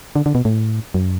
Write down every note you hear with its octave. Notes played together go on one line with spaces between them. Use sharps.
D3
D3
B2
A2
F#2